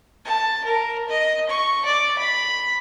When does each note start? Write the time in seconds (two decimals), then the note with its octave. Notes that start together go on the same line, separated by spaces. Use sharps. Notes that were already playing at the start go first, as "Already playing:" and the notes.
0.25 A5
0.64 A#4
1.09 D#5
1.49 C#6
1.85 D5
2.18 B5